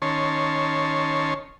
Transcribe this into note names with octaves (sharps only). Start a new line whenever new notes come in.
D#3 C#4 C#5 A5 C6